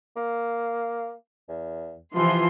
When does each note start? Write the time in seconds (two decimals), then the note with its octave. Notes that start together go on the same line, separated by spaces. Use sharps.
0.16 A#3
1.48 E2
2.15 C3 E3 F3 C6